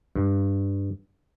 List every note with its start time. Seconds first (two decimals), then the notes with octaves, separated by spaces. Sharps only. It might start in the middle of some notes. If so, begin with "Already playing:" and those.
0.16 G2